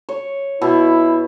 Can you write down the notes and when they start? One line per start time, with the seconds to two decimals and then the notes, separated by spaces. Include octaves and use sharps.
0.09 C#5
0.61 B2 E4